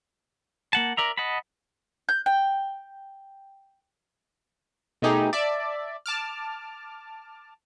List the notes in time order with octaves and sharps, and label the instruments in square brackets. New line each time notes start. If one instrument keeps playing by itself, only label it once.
[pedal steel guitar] A#3 F#5 A5
A#4 D5 E5 A#5
D#5 F#5 A5 B5
[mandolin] G6
G5
[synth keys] B2 A3 D#4 G4 G#4
D5 E5 A5
A5 D6 F6